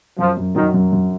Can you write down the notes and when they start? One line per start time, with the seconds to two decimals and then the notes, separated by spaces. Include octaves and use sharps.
0.18 F#2 F3
0.37 F#2
0.55 D#3 F#3
0.74 F#2
0.93 F#2